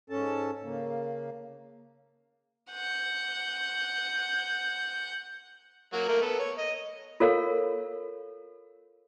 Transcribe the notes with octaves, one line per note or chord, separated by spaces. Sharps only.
G#2 C#4 A4 A5
C#3 A#3
F#5 G6
F#3 A#3 F#4
A3 A#3 A#4
B3 A4
C#5
D#5
F4 A4 A#4 C#5 F5